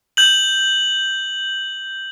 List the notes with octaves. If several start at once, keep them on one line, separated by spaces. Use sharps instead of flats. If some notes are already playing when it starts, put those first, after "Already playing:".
G6 F#7